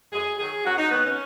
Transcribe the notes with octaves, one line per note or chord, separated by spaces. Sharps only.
F#2 G#4
D#3 F#3 G#4
F#2 F#4
D#4
D#3 F#3 B3
C#4